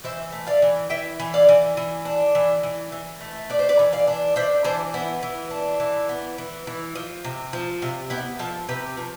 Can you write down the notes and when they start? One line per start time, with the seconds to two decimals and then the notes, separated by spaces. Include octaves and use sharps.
0.04 E3 C5 E5
0.32 A3
0.47 D5 F5
0.62 E3
0.90 E3 E5 G5
1.19 E3
1.34 D5 F5
1.49 E3
1.77 E3
2.05 D4
2.35 E3
2.63 E3
2.92 E3
3.21 A3
3.50 D4 D5
3.59 C5
3.69 B4 D5
3.79 E3
3.92 D5 F5
4.07 D4
4.36 D4 C5 E5
4.64 E3 A4 C5
4.94 B3 E4
5.23 E3
5.51 D4
5.80 E3
6.09 B3
6.38 E3
6.67 E3
6.95 F3
7.24 C3
7.53 F3
7.82 C3 F4
8.10 B3 E4 G4
8.39 F3 F4 A4
8.69 C3 G4 B4
8.97 F3